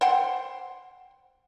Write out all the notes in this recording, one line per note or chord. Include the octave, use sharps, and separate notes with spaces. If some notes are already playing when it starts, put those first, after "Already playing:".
C5 F#5 G5 C6